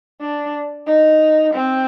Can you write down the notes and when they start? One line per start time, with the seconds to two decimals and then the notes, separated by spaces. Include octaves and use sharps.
0.21 D4
0.87 D#4
1.54 C4